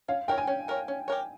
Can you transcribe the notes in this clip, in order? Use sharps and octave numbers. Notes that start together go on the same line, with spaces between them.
C#4 F5
E4 A#4 C#5 G5
G#5
C#4
E4 A#4 C#5
C#4
G4 A#4 C#5